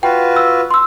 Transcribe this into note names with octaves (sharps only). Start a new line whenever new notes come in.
F4 F#4 B4 G5
E6
C6 E6